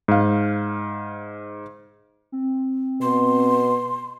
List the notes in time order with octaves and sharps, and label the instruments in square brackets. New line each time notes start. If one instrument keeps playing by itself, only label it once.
[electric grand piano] G#2 F5
[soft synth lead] C4
[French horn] B2 [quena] C6